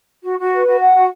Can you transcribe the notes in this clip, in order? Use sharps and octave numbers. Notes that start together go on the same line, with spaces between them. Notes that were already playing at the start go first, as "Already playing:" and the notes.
F#4
F#4
B4
F#4
F#5
F#4